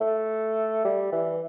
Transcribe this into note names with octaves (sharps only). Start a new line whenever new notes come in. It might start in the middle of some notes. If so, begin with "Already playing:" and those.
A3
G3
E3